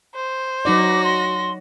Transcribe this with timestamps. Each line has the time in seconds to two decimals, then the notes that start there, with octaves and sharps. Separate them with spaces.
0.15 C5
0.65 F#3 D#4 F#4 D5 D6 A#6
1.04 C6